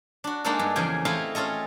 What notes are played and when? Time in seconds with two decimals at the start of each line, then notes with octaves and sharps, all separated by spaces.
0.24 D4 F#4
0.44 G#3 A#3 D4 D#4 F#4 A4
0.59 G2
0.76 E2 C#3 F3 G#4 G5 G#5
1.05 A3 C4 E4 D#5 F5
1.35 C#4 F4 A4 D#5